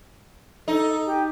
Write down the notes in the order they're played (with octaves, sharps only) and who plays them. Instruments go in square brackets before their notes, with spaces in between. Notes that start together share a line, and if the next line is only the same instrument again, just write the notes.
[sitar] D#4 [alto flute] A4
[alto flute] G4